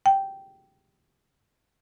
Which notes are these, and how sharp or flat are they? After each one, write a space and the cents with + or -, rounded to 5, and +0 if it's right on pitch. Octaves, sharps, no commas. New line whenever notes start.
G5 -10